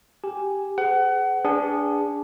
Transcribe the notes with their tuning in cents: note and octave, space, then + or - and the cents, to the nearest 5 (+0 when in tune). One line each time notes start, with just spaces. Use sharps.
G4 +0 G#5 +0
G#4 +20 C5 -45 F#5 +30
D4 -15 G#4 -25 B4 +0